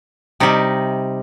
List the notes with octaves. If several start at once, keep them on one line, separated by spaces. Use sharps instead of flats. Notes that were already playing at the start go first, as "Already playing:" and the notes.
C3 G3 D#4